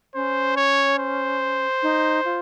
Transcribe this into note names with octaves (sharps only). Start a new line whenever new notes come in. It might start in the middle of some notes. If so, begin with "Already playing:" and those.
C#4 C5
C#5
C5
D#4
F4